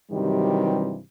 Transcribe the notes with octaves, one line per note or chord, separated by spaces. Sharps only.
G2 C3 D#3 E3 F#3 G3